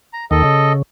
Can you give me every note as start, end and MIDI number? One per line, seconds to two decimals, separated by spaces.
0.13 0.25 82
0.31 0.43 39
0.31 0.43 51
0.31 0.72 69
0.31 0.72 75
0.44 0.82 49